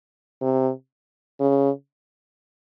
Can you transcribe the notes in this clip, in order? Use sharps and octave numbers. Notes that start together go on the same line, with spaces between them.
C3
C#3